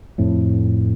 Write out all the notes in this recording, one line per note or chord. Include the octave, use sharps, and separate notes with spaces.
F2 A2